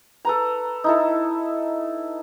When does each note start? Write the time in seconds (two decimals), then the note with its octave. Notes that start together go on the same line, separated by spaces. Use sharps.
0.25 A4 B4 A#5
0.84 D#4 E4 A4